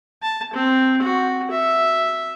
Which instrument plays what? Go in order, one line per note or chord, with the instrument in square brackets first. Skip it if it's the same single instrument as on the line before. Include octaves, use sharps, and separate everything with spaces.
[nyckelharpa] A5
C4
F#4
E5